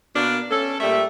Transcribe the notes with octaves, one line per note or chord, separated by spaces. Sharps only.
B2 A#3 D4 A#4 B4
C#4 A4
A#2 G3 A3 E5